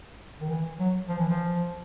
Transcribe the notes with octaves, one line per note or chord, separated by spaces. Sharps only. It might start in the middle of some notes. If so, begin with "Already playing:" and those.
D#3
E3
F#3
F3
E3
F3